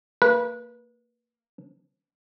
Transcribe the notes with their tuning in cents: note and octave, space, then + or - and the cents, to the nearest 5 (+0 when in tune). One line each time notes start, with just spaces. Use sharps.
A#3 -25 B4 -25